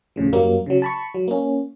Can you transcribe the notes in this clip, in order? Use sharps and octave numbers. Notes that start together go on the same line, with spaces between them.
E2 A2 C#3 F3
F#2 F#3 G3 A#3
C#3 F#3
A5 B5 C#6
F#3
A#3 C#4